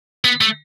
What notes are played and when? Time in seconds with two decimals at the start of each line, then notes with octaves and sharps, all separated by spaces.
0.25 B3
0.41 A3